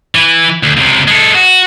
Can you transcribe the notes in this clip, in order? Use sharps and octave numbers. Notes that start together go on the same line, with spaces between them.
E3
D2
C#2 C3
G#3 A4
F#4